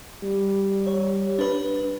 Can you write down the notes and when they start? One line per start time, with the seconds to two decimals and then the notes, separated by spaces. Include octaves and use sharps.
0.23 G3
0.87 C#5
1.39 D4 B4